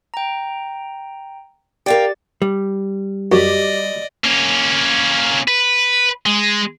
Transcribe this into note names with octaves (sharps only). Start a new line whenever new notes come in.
G5 A#5
G4 A#4 D5 F5 G5 A6
G3
F#2 G4 D5 D#5
A#3 C#4
B4
G#3